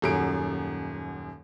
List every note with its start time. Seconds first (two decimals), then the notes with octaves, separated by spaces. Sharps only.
0.02 D#1 F#2 D7